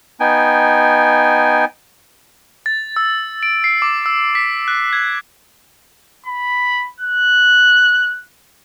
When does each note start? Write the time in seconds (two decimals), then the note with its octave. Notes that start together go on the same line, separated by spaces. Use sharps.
0.20 B3 D#4 G5 G#5
2.66 A6
2.96 E6
3.43 D7
3.64 C7
3.82 D6
4.06 E6
4.35 B6
4.68 F#6
4.93 G#6
6.26 B5
7.00 F#6